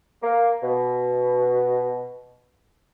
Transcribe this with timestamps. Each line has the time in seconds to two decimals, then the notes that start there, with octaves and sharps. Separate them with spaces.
0.23 A#3
0.62 B2